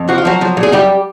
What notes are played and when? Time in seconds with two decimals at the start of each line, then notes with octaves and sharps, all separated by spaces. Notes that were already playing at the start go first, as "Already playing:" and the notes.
Already playing: F2
0.09 F3 F#4
0.18 F4
0.25 F3 F#3 F#4
0.41 F3
0.57 A#2
0.63 G#4
0.72 F#2 G3 G4